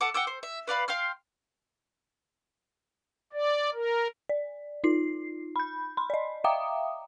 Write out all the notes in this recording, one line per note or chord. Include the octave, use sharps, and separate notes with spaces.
A4 F#5 D6
F#5 G5 D6 E6
C5
E5
B4 D5 F5 B5
F5 G5 C6 F6
D5
A#4
D5
D#4 F4 C7
B5 G6
B5 C6
D5 D#5
E5 F5 G5 A#5 D6 D#6